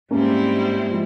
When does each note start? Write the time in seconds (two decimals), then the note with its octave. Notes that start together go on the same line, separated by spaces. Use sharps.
0.11 G#2 G3 A#3 C4 C#4 E4
0.90 F3 G#3